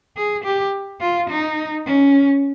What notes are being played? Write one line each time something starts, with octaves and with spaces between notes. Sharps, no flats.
G#4
G4
F4
D#4
C#4